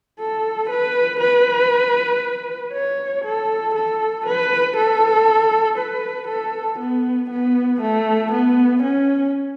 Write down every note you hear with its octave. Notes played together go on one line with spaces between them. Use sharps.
A4
B4
B4
C#5
A4
A4
B4
A4
B4
A4
B3
B3
A3
B3
C#4